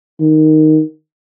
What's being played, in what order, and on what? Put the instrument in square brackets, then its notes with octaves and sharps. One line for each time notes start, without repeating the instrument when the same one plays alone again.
[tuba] D#3